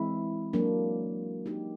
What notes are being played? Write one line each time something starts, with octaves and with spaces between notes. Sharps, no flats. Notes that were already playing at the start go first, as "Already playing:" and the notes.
Already playing: E3 G#3 C4 E4
F#3 A#3 D4
A#3 D#4 G4